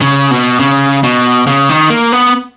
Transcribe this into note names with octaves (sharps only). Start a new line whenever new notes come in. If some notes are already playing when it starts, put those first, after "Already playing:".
C#3
B2
C#3
B2
C#3
D#3
A#3
B3